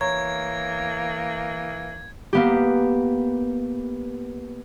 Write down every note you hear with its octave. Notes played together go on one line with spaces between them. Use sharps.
E3 A#3 C#5 A#5 C#6 G#6
A#3 B3 G4